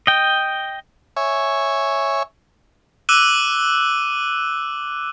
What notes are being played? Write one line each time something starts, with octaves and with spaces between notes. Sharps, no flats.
D#5 G5
C#5 E5 G#5 C#6
D6 E6 F#6 D#7 G7